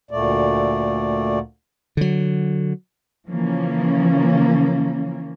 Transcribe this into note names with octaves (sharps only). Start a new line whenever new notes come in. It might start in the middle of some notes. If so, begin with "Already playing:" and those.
D2 A#2 A3 D5
D3 F#3
C#3 E3 F3 A#3 C#4